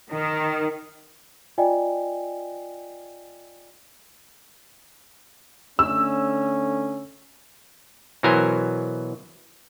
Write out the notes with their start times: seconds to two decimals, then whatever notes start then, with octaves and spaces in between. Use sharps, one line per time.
0.11 D#3
1.58 F4 D5 D#5 G5 G#5
5.79 D3 A3 C#4 E6
8.23 B2 E3 F#3 A#4 C5 G#5